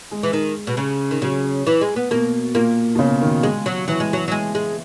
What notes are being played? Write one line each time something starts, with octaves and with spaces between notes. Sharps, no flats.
G#3
E3
D#3
B2
C#3
D#3
C#3 F#3
E3
G#3
B3
B2 A#3
A#2 A#3
B2
C#3
D#3
G#3
F#3
E3 F#3
G#3
F#3
F#3
G#3
G#3